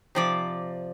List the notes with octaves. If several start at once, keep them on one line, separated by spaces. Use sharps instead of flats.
C3 F3 D5